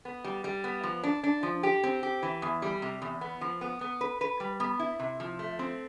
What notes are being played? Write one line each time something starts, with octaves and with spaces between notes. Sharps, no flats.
B3
G3
G3
B3
F3
D4
D4
F3
G4
C4
G4
E3
E2
G3
C3
E2
B3
F3
B3
B3
B4
B4
G3
B3
E4
C3
F3
A3
C4